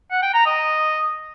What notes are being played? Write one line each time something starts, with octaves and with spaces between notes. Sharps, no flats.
F#5
G5
A#5
D#5